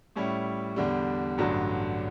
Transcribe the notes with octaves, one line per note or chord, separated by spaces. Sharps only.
A2 G3 C#4 E4
E2 D3 G3
A1 G2 D3 F#3